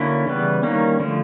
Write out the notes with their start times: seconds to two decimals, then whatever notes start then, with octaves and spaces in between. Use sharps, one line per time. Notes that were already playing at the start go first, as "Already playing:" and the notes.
Already playing: D3 F#3 A#3 C#4 E4
0.27 C#3 E3 G3 B3
0.63 D#3 G3 A#3 C#4
0.99 D3 F3 A3